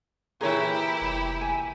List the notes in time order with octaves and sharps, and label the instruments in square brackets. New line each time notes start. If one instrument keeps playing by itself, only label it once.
[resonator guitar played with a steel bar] A#2 E3 [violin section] E4 G4 [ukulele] G#4 A#4 C#5
[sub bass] F1
[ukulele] G#5